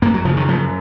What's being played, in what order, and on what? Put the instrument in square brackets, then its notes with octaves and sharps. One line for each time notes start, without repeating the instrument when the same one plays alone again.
[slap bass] F#2 A#3
F#3
C#3 F3
D#3
F#2 F3